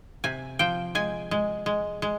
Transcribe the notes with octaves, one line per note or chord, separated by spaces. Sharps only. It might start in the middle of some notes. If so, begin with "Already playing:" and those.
C3 G#5
F3 G5
G#3 G#5
G#3
G#3
G#3